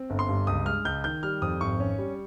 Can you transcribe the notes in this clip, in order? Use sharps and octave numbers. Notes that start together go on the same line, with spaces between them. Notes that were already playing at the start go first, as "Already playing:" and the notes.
Already playing: C4
G1
C6
G2
C#2 D#6
G#3 F6
C#2 G6
D#3 G6
G3 F6
F2 D#6
G#1 C#6
C#4
G3